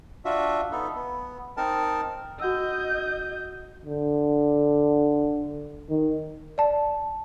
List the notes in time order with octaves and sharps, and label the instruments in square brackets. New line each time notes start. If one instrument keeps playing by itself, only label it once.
[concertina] D4 F4 F#4 E5
B3 D#4 A4
B3
C4 D#4 A#4 A5
[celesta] F#4 F#5 E6 [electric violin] D#5 G6
[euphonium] D3
D#3
[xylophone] D5 A5